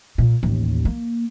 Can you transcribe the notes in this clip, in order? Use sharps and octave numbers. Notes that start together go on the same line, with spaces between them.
A#2
A1 D#2
A#3